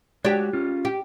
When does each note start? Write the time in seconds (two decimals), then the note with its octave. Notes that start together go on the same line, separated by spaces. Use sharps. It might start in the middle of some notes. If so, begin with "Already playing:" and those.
0.25 G#3 D4 F#4 G4 C#5
0.53 C#4 F4
0.85 G4